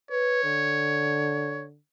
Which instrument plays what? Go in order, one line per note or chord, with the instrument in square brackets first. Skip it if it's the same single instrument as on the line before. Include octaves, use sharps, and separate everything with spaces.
[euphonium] B4 [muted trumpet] C#5
[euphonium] D3